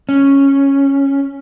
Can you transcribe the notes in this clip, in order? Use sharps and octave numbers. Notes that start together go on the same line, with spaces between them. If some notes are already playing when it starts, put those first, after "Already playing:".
C#4